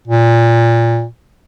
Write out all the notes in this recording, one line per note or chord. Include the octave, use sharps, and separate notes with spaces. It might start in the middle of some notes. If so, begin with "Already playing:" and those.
A#2